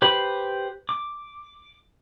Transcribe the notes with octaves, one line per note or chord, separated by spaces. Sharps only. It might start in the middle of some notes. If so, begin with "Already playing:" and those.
G4 B4 C5 B5
D6